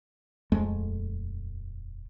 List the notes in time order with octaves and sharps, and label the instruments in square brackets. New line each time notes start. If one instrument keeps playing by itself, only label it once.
[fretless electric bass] D#1 F2 G#3 A3